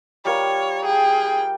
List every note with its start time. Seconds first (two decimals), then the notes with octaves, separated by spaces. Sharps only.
0.25 G3 F4 A#4 C#5
0.85 G#4 G5